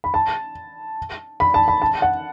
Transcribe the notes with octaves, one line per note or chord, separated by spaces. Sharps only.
B5
A5
B5
A5
B5
A5
F#5